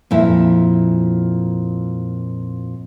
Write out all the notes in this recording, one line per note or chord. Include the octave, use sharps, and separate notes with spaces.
F2 A#2 E4